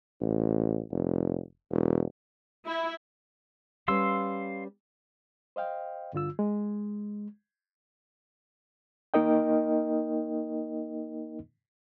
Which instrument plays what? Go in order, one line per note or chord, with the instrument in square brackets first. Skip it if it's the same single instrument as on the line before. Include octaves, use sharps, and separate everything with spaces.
[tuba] A1
F1
E1
[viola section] E4
[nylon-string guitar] G3 C#4 B4 [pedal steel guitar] F5 C6 E6
[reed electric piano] C5 D#5 F5 G5
G2 D3 F4 E6
G#3
A#3 D#4 A#4 D#5 G5